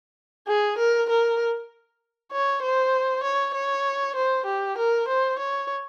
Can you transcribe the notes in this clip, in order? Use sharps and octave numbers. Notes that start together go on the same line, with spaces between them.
G#4
A#4
A#4
C#5
C5
C#5
C#5
C5
G4
A#4
C5
C#5